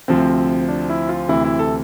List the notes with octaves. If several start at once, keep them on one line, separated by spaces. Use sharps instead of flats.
D2 C3 F3 C4
D4
E4
F4
D2 C3 E3 E4
E4
A4